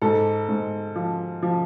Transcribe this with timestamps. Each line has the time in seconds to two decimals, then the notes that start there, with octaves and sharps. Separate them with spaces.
0.02 G#2 A4
0.48 G#2
0.96 F3
1.43 F3